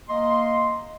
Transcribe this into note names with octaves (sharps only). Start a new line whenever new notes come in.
A#3 D#5 C6